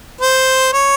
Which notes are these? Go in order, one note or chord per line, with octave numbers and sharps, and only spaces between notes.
C5
C#5